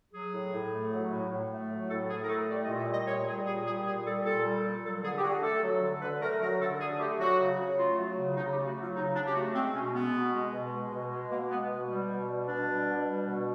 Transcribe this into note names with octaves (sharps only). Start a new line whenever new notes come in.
F#3 G#4
A2
A2
A3
F#3
A2
A2
A3
F#3
A2 A4
A2 G#4
A#4
A3 A4
G3 D5
D#5
A#2
E5
G3 D#5
A#2 C#5
G3 G#4
A#2 G#4
G3 G#4
A#2 G#4
G3 A4
A#2 A4
G3
A#2
F#3 A4
D3 G#4
G4
D3 F#4
A3 A4
F#3
D3
D3 B4
A3 A#4
F#3 A#4
D3 A4
D3 G#4
A3 G4
F#3 F#4
C#3
C#3
A3 F4
F#3
C#3
C#3 D#4
G4
A3
F#4
F#3 F4
C#3 D#4
C#3 D4
G4
A3 F#4
G#3 C4
B2 C#4
G#3 B3
B2
G#3
B2
G#3
B2
G#3
B2 A#3
G#3 B3
B2
G3
B2
G3
B2 D4
G3
B2
G3
B2